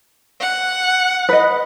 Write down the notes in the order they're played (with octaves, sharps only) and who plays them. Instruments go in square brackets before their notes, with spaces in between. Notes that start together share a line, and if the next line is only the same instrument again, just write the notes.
[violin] F#5
[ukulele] B4 D#5